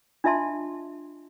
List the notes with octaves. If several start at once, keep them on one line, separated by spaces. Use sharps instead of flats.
D4 F4 D#5 E5 A5 C6